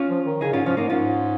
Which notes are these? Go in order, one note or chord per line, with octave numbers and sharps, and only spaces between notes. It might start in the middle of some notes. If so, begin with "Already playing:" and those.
Already playing: C#4 F4
F3
D#3
C#3 D#4 G#4
G#2 C#4 F4
F3 C#4 F4
G#2 A#3 D#4
G#2 C#4 F4